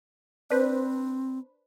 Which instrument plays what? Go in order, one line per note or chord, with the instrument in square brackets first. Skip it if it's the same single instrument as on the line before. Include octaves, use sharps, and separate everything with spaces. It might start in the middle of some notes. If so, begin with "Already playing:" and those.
[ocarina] C4 [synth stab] D4 B4 C5